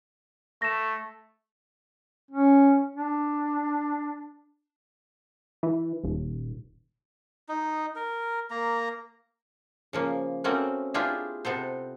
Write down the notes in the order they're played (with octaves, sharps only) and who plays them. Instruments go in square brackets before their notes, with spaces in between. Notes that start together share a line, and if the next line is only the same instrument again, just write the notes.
[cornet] A3 [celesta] A#6 E7
[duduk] C#4
D4
[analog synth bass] E3
D#1
[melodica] D#4
A#4
A#3 A#5
[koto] C#3 F3 A#3
A3 A#3 C4 C#4 F#4
D4 E4 F4 G4 G#4 E5
C3 B3 A4 C5